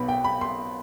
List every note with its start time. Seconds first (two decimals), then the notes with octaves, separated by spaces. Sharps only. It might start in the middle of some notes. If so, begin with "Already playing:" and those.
Already playing: B1 B2 B3 B5
0.08 G5
0.24 B5
0.41 C6